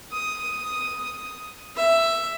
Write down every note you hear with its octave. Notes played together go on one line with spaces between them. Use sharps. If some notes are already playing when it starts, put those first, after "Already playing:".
D#6
E5